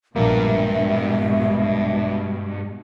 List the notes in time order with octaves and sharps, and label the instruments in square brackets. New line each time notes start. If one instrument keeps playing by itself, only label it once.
[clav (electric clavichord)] A#1 A#3 [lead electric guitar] G2 [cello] B2 G#3 [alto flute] E5